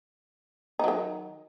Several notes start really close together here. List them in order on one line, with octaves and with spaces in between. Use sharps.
D#4 F#3 D#3